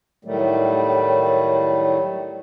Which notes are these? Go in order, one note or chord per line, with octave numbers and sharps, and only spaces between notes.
A2 D#3 F#3 G3 A3